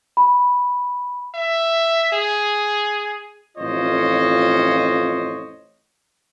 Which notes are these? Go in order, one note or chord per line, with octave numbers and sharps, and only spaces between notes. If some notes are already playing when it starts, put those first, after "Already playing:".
B5
E5
G#4
A1 F2 F4 C5 C#5 D#5